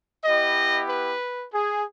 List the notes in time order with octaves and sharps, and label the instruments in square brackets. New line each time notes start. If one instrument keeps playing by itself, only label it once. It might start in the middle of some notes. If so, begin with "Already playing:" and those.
[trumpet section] B3 E4 G4 D#5
B4
G#4